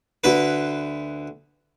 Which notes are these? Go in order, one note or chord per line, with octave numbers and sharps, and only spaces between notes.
D2 B4